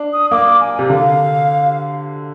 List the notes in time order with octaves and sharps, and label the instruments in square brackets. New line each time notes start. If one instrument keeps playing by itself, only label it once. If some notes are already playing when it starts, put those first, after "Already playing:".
Already playing: [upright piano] D4
[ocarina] D#6
[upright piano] A#3 [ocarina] D6
[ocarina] D6
G#5
[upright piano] C3 [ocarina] G#5
[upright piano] D3 [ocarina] F5